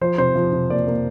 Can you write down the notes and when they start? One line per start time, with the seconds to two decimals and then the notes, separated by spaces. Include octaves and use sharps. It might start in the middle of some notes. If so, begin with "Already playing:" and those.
0.01 F3 C5
0.18 C3 C5
0.36 F3
0.53 C3
0.70 A#3 D5
0.87 A#3